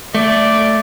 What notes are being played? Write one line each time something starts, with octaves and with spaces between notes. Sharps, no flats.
A3 D5